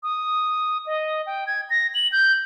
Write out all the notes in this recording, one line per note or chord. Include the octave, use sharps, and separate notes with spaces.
D#6
D#5
G5
G#6
A#6
F#7
G6